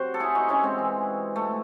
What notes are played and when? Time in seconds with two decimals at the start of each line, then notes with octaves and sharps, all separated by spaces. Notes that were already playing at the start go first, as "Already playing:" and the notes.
Already playing: C3 F#3 F#4 C5
0.14 A4
0.20 E4 G#4
0.35 D#4 F#4
0.49 C#4 E4
0.63 G#3 C4
0.78 C3 E3
1.36 A3